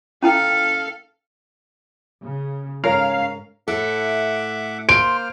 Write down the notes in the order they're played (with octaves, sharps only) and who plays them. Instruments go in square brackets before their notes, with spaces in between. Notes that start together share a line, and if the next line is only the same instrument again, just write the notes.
[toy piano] C#4 E4 G5 [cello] A4 F5
[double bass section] C#3
[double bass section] G#2 C#4 [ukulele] A#4 [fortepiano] C#5 [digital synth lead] F5
[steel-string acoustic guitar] A2 E4 A4 [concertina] E5 F#5 D6
[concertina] A#3 C5 F6 [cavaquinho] C6 [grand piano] D7